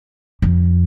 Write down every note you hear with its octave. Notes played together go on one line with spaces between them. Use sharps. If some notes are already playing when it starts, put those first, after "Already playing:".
F2